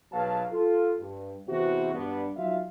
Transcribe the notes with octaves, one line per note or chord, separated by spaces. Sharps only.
B1 F#3 G#4 B4 F5 A5
F4 A4
G2
E2 C3 F#4
G2 B3 D4
F#3 D#4 F4 E5 F5